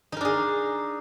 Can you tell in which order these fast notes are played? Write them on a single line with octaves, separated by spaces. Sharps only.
D#4 A#4 D4 G#4